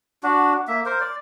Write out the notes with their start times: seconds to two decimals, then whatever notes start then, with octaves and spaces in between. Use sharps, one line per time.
0.23 D4 F#4
0.68 A#3 E5
0.86 A#4 C5
1.01 D5